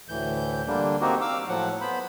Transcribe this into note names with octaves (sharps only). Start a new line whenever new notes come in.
D2 A2 E3 G6
D3 G3 A#3 D4
A#3 C4 D#4 F#4 G4
F5 D6 E6
A2 F3 F#3 F#5
B3 C5 B5